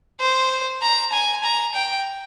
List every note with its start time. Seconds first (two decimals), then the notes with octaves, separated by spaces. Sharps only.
0.20 C5
0.82 A#5
1.13 G#5
1.44 A#5
1.74 G5